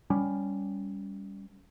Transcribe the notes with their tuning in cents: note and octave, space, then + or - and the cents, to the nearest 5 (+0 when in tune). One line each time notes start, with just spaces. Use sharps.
G3 +10 C#4 +20